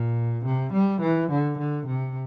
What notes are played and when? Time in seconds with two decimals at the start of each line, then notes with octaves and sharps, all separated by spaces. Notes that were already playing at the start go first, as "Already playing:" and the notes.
Already playing: A#2
0.45 C3
0.73 G3
1.01 E3
1.31 D3
1.58 D3
1.86 C3